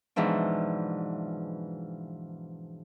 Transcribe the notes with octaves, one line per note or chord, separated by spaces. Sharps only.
G#2 B2 E3 F3 D4